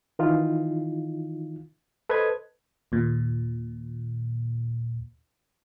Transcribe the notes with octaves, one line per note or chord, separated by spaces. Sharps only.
D#3 E3 D#4 F4
A4 B4 C5 D#5 G#6
D#2 A#2